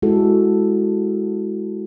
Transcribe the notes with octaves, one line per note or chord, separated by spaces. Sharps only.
G#3 E4 F#4 G#4 A4